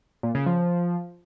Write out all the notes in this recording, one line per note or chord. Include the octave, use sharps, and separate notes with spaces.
A#2
C#3
F3